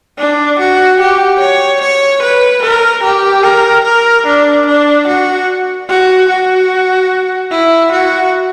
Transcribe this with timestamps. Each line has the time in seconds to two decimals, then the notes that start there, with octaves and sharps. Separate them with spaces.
0.18 D4
0.59 F#4
1.00 G4
1.40 C#5
1.82 C#5
2.22 B4
2.62 A#4
3.03 G4
3.44 A#4
3.85 A#4
4.26 D4
4.66 D4
5.08 F#4
5.89 F#4
6.29 F#4
7.51 E4
7.92 F#4